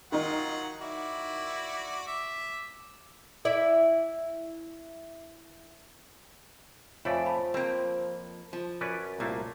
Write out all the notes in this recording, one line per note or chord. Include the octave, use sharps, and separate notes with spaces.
D#3 F#3 D#4 F4 F#5
E4 F#4 D5
E5 D6
E4 D5
F2 F3 A3 E4 C#5 D5 F5 G#5
A5 B5
F2 A#3 C4 G5
F3
F#2 C#4 B4 D5
C2 A#2 A3 A#3